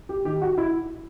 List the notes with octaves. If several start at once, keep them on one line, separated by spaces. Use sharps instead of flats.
G4
D#3 G4
F#4
E4